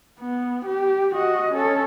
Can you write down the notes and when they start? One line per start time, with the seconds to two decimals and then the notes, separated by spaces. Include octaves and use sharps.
0.19 B3
0.65 G4
1.15 F#4 D#5
1.52 C#4 A4